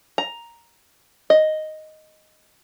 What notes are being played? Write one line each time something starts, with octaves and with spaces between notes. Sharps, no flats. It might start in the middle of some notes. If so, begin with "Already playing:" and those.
A#5
D#5